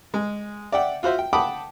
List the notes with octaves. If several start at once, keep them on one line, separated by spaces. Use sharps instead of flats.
G#3
D5 E5 F#5 G5
F4 F#4 C5 E5
G5
F#5 G5 A5 B5 D6 D#6